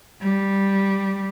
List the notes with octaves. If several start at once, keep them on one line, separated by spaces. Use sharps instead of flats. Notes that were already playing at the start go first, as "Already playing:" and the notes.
G3